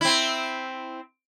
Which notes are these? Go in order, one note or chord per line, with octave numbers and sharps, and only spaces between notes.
C4 E4